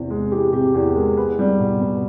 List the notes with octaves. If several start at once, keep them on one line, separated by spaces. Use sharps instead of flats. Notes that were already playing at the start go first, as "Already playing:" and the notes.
Already playing: E2 C3
G#3
E3 G4
C3 G4
E2 G#4
G#3 A#4
B3 B4
G3
B2
B2